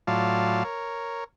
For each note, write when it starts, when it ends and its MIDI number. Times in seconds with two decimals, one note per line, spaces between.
0.07 0.63 45
0.07 0.63 54
0.07 0.63 65
0.07 0.63 74
0.07 0.63 77
0.07 0.63 81
0.64 1.24 70
0.64 1.24 73